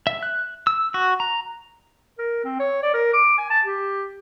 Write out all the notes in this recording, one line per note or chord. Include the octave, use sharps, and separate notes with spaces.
E5
F#6
E6
F#4
A#5
A#4
C4
C#5
D5
A#4
D6
G#5
A5
G4